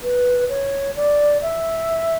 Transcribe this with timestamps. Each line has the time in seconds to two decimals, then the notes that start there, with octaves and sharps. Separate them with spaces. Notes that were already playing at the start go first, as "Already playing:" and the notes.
0.03 B4
0.49 C#5
0.96 D5
1.42 E5